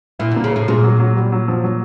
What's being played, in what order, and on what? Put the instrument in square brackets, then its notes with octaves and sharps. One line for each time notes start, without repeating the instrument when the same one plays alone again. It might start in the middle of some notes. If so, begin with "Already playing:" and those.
[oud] A#2 [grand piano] E4
[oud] D3 [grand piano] A#3
[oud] C#3
[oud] A2 [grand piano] A3
[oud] A#2 [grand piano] G#3
[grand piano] F#3
F#3
G3
F#3
F3
F#3